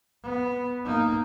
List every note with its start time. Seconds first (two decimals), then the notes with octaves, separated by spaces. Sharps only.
0.24 B3
0.85 A#3 D#4